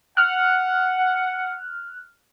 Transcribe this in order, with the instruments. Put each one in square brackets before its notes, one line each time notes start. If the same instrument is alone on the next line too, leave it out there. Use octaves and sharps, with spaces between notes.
[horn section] F#5 [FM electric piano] F6 F#6